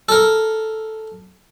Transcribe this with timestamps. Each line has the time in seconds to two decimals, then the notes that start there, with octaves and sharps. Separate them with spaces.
0.09 A4 A#4